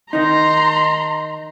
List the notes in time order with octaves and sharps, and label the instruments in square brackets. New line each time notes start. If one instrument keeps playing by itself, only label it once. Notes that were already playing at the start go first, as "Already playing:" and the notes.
[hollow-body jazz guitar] D#3 D#4 [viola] A#5 C6